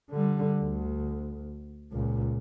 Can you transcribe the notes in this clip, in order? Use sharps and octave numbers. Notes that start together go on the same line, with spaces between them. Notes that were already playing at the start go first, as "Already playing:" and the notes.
D3 G3
D2
C#2 A#2